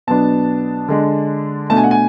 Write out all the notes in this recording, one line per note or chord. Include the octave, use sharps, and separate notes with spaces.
B2 F#3 B3 D4 A5
D3 G#3 D4
B2 A3 D4 A5
G#5
F#5
G#5